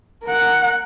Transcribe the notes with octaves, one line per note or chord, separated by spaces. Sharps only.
A#4 F#5